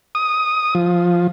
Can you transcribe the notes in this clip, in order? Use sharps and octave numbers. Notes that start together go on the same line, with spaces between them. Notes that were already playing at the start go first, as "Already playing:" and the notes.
D#6
F3